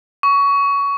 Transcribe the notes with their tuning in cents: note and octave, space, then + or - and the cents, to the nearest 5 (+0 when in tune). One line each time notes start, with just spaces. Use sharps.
C#6 +20